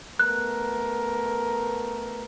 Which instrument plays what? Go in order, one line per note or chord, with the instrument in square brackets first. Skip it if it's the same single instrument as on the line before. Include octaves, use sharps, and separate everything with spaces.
[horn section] A3 B3 A#4 [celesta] F#6